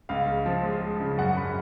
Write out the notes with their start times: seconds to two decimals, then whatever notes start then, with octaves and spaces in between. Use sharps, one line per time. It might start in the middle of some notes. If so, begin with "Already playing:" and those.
0.09 C#2 F5
0.27 C#3
0.46 F3
0.63 G#3
0.81 G#3
1.00 C#3
1.17 F#2 F#5
1.36 F#2 B5